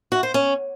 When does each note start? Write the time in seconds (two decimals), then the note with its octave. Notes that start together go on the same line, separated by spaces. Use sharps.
0.12 F#4
0.23 C5
0.34 C#4